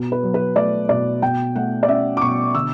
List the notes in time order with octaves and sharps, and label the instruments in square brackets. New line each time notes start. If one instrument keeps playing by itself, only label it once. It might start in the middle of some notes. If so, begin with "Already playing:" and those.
Already playing: [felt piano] B2
B4
F#3
B4
A3 D5
B2 D5
B2 G5
A3 F#5
D5
C#4 E5
D6
B2 C#6
D3 E6